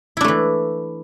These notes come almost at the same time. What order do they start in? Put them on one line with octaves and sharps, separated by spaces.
E4 D4 A3 E3